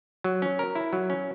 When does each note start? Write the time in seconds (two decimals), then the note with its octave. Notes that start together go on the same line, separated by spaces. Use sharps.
0.24 F#3
0.42 C#4
0.59 A#4
0.75 E4
0.93 F#3
1.10 C#4